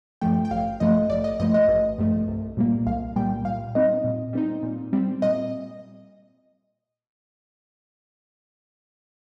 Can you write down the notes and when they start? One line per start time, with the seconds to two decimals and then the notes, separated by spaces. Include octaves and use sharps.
0.21 G2 F3 A3 G5
0.45 G5
0.51 A1 F5
0.80 G2 F3 A3 D#5
1.10 A1 D5
1.24 D#5
1.40 G2 F3 A3 D#5
1.54 D#5
1.68 A1
1.99 G2 F3 A3
2.28 C2
2.57 A#2 G3 A#3
2.86 C2 F5
3.16 A#2 G3 A#3 G5
3.45 A#2 F5
3.75 G3 C4 D#4 D#5
4.04 A#2
4.33 G3 C4 D#4
4.63 A#2
4.93 G3 C4
5.22 A#2 D#5